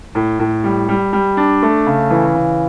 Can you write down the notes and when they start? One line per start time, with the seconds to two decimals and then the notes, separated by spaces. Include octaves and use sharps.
0.15 A2
0.39 A2
0.64 G3
0.89 G3
1.13 G3
1.37 D4
1.63 A3
1.86 C#3
2.10 E3
2.35 C#3